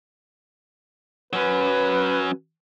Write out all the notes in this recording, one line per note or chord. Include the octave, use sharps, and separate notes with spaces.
F#3 C#4 B4